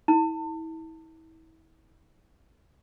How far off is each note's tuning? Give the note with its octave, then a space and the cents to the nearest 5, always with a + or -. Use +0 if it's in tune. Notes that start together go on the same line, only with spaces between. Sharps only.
E4 -35 A5 +30